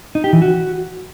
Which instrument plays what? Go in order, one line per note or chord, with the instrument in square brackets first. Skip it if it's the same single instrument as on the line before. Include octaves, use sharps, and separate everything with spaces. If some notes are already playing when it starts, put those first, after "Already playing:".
[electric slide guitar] D#4
G4
E3
F#4